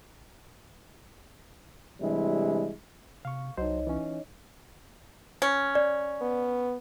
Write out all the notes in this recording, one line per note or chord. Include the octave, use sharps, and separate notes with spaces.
C3 E3 G3 G#3 D4 E4
C3 F5 C#6
C2 F#3 D#4 C5 C#5 D#5
E3 C#4
C#4
D5
B3